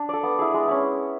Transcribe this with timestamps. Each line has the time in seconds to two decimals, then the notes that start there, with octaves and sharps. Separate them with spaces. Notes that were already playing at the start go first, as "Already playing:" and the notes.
Already playing: D4
0.09 A4 D5
0.23 B3
0.39 E4 G#4
0.54 G#3
0.68 C#4 E4